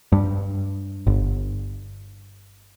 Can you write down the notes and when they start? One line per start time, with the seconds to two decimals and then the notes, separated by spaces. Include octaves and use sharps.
0.12 G2
1.07 G1